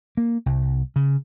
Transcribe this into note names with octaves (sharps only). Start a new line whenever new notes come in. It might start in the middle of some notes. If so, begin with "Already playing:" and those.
A#3
C2
C#3